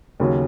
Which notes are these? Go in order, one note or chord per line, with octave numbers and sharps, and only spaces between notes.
D#2 C#3 F#3